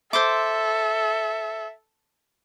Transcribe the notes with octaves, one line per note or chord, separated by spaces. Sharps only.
A4 C5 E5 C6 D6